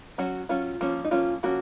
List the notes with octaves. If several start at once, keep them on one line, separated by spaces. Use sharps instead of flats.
F#3 C#4 F#4
F#3 C#4 F4
F3 A#3 C#4
D#4
F3 A#3 C#4 F4
F3 A#3 C#4 F#4